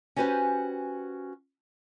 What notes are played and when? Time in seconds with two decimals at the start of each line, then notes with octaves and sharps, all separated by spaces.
0.16 C#4 F#4 G4 B4 C5 G#5